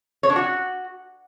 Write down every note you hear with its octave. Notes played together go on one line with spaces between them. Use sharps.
C#5
D4
F#4